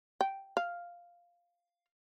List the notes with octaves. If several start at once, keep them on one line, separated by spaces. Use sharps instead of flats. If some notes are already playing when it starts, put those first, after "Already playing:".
G5
F5